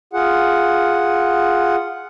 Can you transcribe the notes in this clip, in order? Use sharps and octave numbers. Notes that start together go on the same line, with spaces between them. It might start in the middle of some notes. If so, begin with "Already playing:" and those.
F4 G#4 F#5